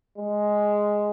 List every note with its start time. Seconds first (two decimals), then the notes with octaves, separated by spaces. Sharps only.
0.18 G#3